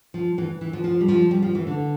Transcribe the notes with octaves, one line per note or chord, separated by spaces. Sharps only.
F3
E3
E3
F3
F3
G3
F3
G3
F3
E3
D3